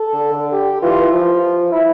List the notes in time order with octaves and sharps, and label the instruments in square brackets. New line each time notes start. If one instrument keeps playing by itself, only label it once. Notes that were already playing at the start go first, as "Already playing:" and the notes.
Already playing: [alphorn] A4
[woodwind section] D3
D3
[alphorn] G4
[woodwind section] E3 [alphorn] F4
[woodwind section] E3
[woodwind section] F3 [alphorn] F4
[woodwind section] E4